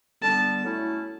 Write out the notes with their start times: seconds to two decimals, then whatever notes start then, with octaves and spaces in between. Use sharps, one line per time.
0.23 D3 G3 B3 A5
0.64 A2 F#3 A3 C#4 E4